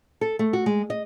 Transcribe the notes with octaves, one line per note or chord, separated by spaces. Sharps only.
A4
A3
F#4
G#3
D#5